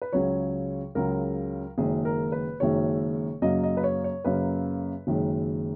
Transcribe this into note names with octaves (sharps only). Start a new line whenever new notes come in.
B4
C#2 C#3 F#3 C#5
C#2 C#3 F#3 A#4
F#1 F#2 D#3 G#3 G#4
A#4
B4
F#1 F#2 D#3 G#3 C#5
F#2 C#3 F#3 A#3 D#5
D#5
B4
C#5
C#5
F#2 C#3 F#3 A#3 B4
F#1 F#2 D#3 G#3